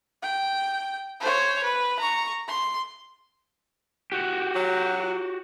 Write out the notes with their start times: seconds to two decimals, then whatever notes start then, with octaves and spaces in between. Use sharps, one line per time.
0.23 G5
1.21 C5 C#5
1.64 B4
2.00 A#5 C#6
2.48 C6
4.12 F#4 G4
4.55 F#3